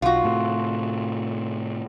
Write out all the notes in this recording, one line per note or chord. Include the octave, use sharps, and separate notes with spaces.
B1 F4 F#4
A2 C3